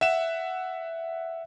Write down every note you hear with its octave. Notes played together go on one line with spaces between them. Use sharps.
E5 F#5 E7